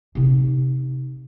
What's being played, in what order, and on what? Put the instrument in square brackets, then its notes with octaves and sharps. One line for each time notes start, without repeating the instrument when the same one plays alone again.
[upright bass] C3 D#4